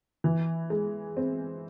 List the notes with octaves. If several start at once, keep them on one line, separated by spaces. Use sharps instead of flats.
E3
G#3
C4